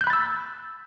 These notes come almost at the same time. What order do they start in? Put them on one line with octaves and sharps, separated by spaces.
G6 F#6 B5 A6 E6